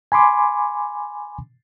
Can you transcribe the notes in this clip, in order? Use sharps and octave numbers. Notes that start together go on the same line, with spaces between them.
G#5 B5 C6 D6